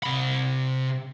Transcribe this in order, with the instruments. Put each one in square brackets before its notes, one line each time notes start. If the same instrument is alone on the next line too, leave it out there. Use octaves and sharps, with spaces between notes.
[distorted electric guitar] C3 B5